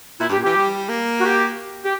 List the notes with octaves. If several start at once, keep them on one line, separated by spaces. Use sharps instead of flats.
A#2 E4
G2 G4
A#2
E3 G4
G3
A#3
F#4
G4
G4